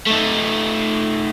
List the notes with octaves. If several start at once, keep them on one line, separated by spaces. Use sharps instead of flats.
A3 D#4